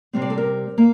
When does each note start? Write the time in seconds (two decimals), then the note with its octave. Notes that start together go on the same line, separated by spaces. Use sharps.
0.13 C3 G3 C4
0.22 D5
0.30 A4
0.38 A#4
0.78 A#3